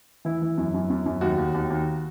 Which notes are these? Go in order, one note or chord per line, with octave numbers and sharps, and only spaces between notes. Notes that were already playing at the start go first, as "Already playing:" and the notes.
E3 E4
E3
F#2
F#2
F#2
F#2
D#2 F#4
D#2
D#2
D#2